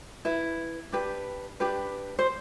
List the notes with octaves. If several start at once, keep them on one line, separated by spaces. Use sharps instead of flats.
E4 B4
D4 G4 B4
D4 G4 B4
C5